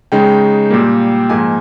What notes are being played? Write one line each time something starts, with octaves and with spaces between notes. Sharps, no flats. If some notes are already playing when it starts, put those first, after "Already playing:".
C#3 G#3 D#4 G5
A#2 G3 A#3
G#2 F3 A#3 D#4 G#5